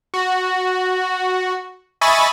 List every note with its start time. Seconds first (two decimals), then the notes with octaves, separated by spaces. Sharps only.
0.14 F#4
2.01 D#5 E5 G#5 B5 C#6 A6